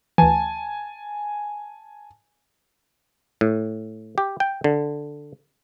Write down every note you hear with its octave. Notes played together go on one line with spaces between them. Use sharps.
D2 E3 G#5 A5
A2
G4
G5
D3